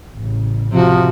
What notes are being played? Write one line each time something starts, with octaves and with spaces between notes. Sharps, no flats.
A1 C#3
C3 F3 F#4